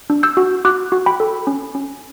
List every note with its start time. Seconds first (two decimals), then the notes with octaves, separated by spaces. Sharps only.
0.10 D4
0.23 E6 G6
0.37 F#4
0.65 F#4 D6 F#6
0.92 F#4
1.06 G5 B5
1.20 A4
1.47 C#4
1.75 C#4